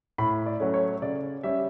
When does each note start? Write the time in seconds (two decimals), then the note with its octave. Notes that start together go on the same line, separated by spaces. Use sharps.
0.18 A2 B5
0.46 D5
0.60 F#3 A3 C#4
0.74 C#5
1.02 C#3 D5
1.43 G3 C#4 E5